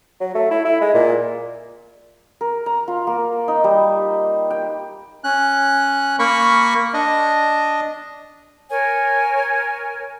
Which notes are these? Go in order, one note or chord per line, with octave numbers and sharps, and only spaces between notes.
F#3
A3
E4
E4
G#3
A#2
A#4
A#5
F4
A#3
D#4
G3
G5
C#4 F#6
A#3 A#4 B5 C#6
D4 D#5
A#4 C#5 G#5